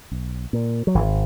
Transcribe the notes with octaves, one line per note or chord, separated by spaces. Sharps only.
B1
A#2
F#3
G#1 E3